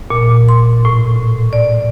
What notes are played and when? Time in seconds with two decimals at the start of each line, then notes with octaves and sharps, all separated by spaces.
0.10 A#2
0.49 C6
0.85 A2
1.53 D5